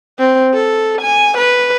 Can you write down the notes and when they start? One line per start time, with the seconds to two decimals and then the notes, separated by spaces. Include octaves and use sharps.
0.19 C4
0.54 A4
1.02 G#5
1.38 B4